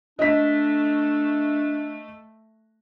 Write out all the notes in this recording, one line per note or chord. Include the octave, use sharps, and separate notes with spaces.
A3 D4 D#5 B6